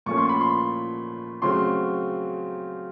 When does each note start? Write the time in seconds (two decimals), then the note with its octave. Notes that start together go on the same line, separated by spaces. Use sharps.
0.06 A#2 F3 A3 C#4 C#6
0.18 C6
0.29 B5
0.41 C6
1.42 C#3 F#3 A3 C4 C6